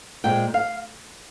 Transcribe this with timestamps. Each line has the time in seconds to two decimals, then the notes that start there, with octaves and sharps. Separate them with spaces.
0.24 A#2 G#3 C4 G5
0.54 F5